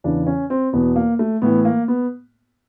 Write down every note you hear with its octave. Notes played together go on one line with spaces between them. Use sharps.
E2 C#3 E3 D4
C#4
C4
E2 B2 B3
A#3
A3
A2 E3 B3
A#3
B3